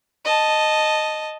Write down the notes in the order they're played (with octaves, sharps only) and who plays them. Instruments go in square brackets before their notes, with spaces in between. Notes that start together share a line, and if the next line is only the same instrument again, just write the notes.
[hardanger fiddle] D#5 A5